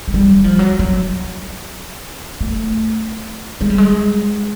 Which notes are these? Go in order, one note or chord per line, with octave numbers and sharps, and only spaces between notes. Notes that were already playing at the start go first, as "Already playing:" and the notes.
G#3
G3
G3
F3
F#3
F#3
A3
G#3
G3
G#3